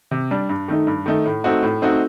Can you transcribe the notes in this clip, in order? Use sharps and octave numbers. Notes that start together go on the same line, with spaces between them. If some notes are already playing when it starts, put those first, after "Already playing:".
C3
G3 D4
G2
D#3 A3 D#4
G2
D#3 A3 D#4
A2
A3 C4 D#4 F#4
A2
A3 C4 D#4 F#4